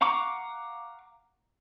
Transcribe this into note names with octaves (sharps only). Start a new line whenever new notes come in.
F5 F#5 A#5 C#6 D6